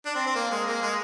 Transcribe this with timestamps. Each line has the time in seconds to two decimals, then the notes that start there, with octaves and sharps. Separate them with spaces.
0.05 D4
0.15 C4
0.26 C4
0.35 A#3
0.51 G#3
0.67 A#3
0.82 G#3